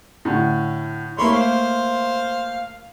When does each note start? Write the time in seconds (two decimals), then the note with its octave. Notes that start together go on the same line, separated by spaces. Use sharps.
0.25 A2 D3
1.18 A3 A#3 C#5 B5 C6
1.32 C5 F5